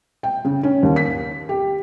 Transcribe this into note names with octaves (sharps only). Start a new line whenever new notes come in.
G5
C#3
C#4
D#2
B6
G4